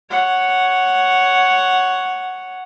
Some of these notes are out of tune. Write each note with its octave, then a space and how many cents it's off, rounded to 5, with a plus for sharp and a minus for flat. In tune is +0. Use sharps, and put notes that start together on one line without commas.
C#5 +0 F#5 +0